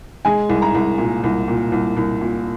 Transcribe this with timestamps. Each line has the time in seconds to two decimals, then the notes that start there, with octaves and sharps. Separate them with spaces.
0.25 G#3 G#5
0.49 C2
0.62 A#5
0.75 C2
0.98 A#2
1.24 C2
1.48 A#2
1.72 C2
1.97 C2
2.21 A#2